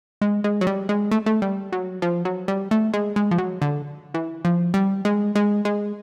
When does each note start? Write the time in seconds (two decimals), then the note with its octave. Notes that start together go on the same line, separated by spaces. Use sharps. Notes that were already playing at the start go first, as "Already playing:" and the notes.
0.22 G#3
0.44 G#3
0.61 F#3
0.67 G3
0.89 G#3
1.11 A3
1.26 A3
1.42 G3
1.72 F#3
2.02 F3
2.25 F#3
2.48 G3
2.71 A3
2.94 G#3
3.16 G#3
3.31 F3
3.38 F#3
3.62 D3
4.14 E3
4.45 F3
4.74 G3
5.05 G#3
5.35 G#3
5.65 G#3